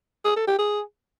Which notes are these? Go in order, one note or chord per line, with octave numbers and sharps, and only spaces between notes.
G#4
A4
G4
G#4